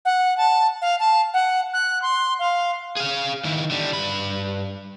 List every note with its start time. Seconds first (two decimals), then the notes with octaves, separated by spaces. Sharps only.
0.05 F#5
0.38 A5
0.82 F5
0.99 A5
1.34 F#5
1.73 F#6
2.02 C6
2.39 F5
2.97 G#4 F5
3.44 D#3 E4
3.71 D3 G3
3.93 G2 B5